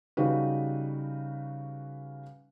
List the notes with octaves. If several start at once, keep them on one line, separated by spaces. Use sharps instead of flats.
C#3 G3 D#4 F#4 B4